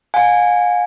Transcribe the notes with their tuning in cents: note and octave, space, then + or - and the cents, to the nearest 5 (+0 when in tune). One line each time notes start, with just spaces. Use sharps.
F5 +45 G#5 -10